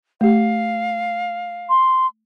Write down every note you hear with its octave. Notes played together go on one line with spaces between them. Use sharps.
A3 G4 F5
C6